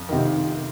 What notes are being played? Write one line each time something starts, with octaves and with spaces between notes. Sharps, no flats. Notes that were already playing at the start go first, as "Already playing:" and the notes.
Already playing: F2
C3 D#3